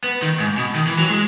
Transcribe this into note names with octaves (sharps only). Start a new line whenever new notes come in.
B3
D#3
G#2
B2
D#3
E3
F#3
G#3